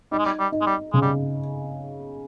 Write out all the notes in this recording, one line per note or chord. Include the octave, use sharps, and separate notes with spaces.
G3 D#4
G#3
G3
G3
D#4
G#3
G3
C#3 G#3
G3